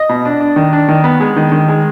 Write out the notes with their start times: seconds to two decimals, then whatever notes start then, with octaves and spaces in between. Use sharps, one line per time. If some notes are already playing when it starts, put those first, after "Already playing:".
Already playing: D#5
0.09 B2
0.25 D4
0.41 D4
0.56 D#3
0.73 D4
0.88 D#3
1.04 B3
1.20 G#3
1.36 D#3
1.52 D#3
1.68 G#3